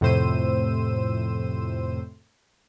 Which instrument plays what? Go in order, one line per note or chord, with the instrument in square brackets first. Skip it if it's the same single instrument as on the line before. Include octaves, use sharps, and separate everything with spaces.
[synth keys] F2 A2 C3 C5 E6 D#7